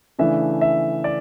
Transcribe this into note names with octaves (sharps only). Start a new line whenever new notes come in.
C#3 E3 A3 D4 E5
E5
D5